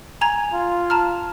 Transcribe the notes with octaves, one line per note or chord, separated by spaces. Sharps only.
G#5 A#5 G#6
F4
A5 A#5 F6